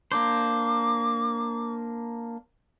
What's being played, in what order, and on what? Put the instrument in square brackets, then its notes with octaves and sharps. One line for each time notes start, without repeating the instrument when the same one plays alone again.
[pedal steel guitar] A#3 D4 C5 [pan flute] D6